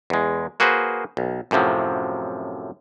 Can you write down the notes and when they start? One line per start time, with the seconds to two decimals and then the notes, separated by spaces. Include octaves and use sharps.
0.10 E2 G#3
0.60 A#3 F#4 G#4 B4 C5
1.17 B1
1.51 F#2 A2 C3 F3 F#3